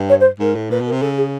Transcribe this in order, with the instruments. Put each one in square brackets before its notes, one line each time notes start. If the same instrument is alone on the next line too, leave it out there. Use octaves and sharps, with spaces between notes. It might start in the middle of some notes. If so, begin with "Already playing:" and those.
Already playing: [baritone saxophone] G2
[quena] C#5
C5
[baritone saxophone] G#2 [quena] A#4
[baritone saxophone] A2
[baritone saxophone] A#2 [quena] B4
[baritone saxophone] B2
[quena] A#4
[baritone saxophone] C3
[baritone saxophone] C#3 [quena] A4
[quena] G#4